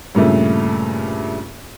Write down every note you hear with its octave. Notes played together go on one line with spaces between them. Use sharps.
G2 A#2 C#3 A3